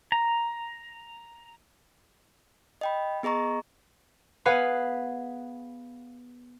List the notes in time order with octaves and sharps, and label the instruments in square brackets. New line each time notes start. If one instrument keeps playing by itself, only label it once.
[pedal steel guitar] A#5
[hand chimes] D#5 G5 B5
B3 G#4 D#5 A#5 C#6
[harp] B3 G#4 B4 F5 F#5 B5